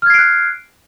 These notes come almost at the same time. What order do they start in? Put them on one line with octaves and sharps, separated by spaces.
F6 G#6 C7 D7 F#6